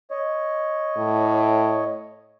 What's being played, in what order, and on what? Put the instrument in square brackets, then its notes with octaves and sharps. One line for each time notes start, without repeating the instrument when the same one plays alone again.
[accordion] C#5 D#5
[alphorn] A2